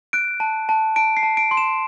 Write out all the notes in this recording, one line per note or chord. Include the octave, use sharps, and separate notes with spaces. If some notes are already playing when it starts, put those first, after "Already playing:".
F#6 D7
A5
A5
A5 D7
C7
A5
D7
C6
E7